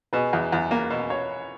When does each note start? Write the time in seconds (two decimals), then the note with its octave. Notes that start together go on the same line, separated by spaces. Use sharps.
0.13 B2 G#4 B4
0.33 E2
0.52 E2
0.71 A#3
0.90 B2
1.10 C#5